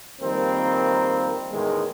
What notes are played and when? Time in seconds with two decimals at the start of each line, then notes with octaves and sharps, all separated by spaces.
0.21 F2 D#3 G3 A#3 C4 A#4
1.52 E2 A2 D#3 G#3